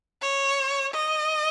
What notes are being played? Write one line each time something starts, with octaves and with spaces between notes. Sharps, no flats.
C#5
D#5